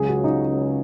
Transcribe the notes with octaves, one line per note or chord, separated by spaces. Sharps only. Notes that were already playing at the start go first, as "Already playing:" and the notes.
Already playing: C#2 C#3 F#3 G#4
F#4
D#4